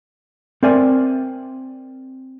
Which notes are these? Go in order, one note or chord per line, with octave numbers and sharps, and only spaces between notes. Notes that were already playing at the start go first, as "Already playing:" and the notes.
C4 A#4 D5 E5 G#5